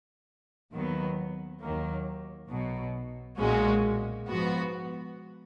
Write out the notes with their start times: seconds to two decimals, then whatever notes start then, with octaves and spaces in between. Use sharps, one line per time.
0.72 D#2 D#3 F#3 B3
1.61 D#2 D#3 F#3 A#3
2.49 B1 B2 F#3
3.38 B1 A#2 G#3 C#4 F#4
4.27 G#2 F3 B3 F#4